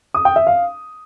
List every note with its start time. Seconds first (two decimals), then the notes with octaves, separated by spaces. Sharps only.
0.14 D#6
0.25 G5
0.36 E5
0.47 F5